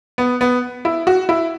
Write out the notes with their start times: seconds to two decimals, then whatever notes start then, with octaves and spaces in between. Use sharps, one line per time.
0.18 B3
0.41 B3
0.85 E4
1.07 F#4
1.29 E4